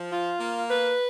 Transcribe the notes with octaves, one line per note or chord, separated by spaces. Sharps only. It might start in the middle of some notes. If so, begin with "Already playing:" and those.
Already playing: F3
F4
A#3
B4